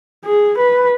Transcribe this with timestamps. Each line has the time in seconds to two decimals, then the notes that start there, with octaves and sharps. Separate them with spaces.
0.25 G#4
0.58 B4